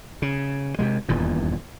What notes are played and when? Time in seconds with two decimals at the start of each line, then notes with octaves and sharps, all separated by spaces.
0.22 C#3
0.79 C3 D#3 G#3
1.09 D#1 E2 G2 A#2